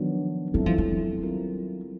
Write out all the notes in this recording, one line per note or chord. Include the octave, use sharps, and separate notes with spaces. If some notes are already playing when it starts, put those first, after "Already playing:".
Already playing: D#3 F3 F#3 B3 D4
F#3 G3 C4 E4 A4
F3
F#3
G3 C4 F4 A#4